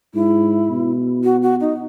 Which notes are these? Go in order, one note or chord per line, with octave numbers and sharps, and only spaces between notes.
G#2 E4
B2
F#4
F#4
D#4